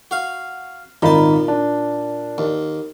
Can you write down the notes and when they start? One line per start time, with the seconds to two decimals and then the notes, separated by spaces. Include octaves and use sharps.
0.11 F#4 F5
1.02 G#1 A#2 D#4 A5 B5
1.48 D4
2.38 D#2